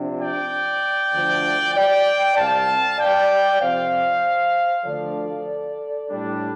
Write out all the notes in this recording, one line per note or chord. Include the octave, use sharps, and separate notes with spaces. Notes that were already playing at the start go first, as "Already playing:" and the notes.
Already playing: C3 F3 D4
D5 G5
D2 D3 F3 D4
D5 G5
C2 C3 G3 C4 F5 A5
D5 G5
F2 C3 F3 C5 F5
D2 D3 F3 A4 D5
A2 G3 D4